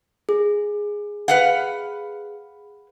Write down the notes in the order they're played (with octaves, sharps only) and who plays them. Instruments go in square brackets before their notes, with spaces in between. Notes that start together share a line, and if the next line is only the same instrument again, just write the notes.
[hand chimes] G#4
[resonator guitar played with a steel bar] B4 F5 F#5